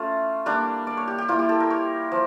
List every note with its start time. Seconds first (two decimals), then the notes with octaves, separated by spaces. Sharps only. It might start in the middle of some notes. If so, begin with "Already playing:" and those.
Already playing: A3 C#4 F4
0.46 G3 A#3 D4
0.87 D5
0.97 C#5
1.08 G4
1.18 G4
1.28 G3 A#3 E4 F4
1.39 G4
1.49 A4
1.60 A#4
1.70 C#5
2.12 F3